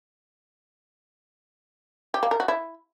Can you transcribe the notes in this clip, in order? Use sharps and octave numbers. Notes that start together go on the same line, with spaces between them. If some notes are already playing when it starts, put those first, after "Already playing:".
G4
A#3
A#4
F#4
E4